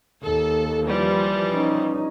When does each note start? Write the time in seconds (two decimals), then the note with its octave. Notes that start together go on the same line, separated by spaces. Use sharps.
0.23 D#2 A4
0.83 E3 F3 G3
1.52 C#4 D#4